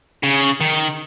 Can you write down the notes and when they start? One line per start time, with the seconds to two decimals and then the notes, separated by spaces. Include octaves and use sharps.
0.23 C#3
0.60 D#3